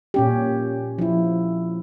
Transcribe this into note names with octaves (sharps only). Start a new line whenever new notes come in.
A#2 C#4 G4
F3 E4